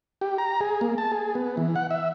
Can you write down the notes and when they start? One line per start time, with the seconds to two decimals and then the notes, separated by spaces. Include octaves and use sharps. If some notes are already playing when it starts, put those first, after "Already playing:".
0.21 G4
0.38 A#5
0.61 G#4
0.81 A#3
0.98 A5
1.12 G#4
1.35 B3
1.57 E3
1.76 F#5
1.91 E5